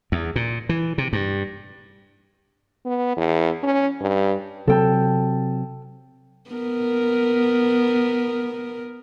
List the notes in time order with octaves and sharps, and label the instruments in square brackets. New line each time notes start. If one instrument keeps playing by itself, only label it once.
[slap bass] E2
A#2
E3
C3
G2
[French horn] B3
E2
C#4
G2
[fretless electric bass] C3 F#3 [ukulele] A4 G5 A5
[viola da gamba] B3 A#4